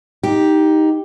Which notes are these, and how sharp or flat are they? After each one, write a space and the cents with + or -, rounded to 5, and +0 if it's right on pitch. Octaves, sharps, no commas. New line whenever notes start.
D#4 +10 G4 +0